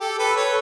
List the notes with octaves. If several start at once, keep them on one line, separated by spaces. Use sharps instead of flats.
G4 A4
A4 B4
B4 C#5